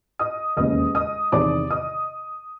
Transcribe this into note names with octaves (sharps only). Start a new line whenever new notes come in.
D#5 D#6
E1 D#2 C#3 D#5 D#6
D#5 D#6
E2 C3 D#3 D5 D6
D#5 D#6